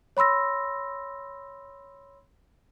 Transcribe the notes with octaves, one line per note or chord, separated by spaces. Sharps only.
C#5 B5 C6 E6 A#6